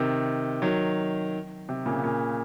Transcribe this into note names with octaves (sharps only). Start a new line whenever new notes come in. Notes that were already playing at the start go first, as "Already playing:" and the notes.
Already playing: C3 D#3
D#3 F#3
C3
A#2 C#3
A#2 C#3